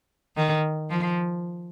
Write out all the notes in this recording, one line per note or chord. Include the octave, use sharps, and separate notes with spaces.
D#3
F3